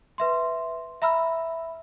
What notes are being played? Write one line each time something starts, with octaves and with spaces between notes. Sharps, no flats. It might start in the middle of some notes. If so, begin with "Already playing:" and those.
B4 E5 C6
E5 A#5 B5 E6 F6